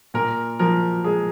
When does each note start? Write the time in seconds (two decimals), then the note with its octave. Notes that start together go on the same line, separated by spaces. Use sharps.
0.14 A#2 A#4
0.59 F3 A#4
1.04 G#3 G#4